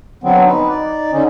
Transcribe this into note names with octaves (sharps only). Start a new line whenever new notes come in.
D3 F#3 B3 C4
D#4 B4
D#4 D5
D3 C#4 D#4